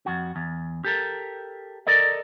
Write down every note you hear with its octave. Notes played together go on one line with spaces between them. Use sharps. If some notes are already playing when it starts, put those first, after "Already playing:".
F2 F#4
E2
G4 A4 A#4
A4 A#4 D5 D#5